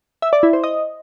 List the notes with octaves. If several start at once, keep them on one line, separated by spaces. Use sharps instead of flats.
E5
D5
E4
C5
D#5